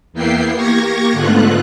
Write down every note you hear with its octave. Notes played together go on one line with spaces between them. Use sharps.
E2 A#3 B3 E4 G5 C7
A#3 G4 C#6 G#6 A#6
G#2 D3 A3 B3 F4 F#6